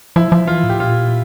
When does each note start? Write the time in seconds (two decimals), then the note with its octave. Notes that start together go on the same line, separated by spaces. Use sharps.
0.16 F3 E4
0.32 F3
0.47 E3 F4
0.64 A2
0.69 G4
0.80 A#2 F4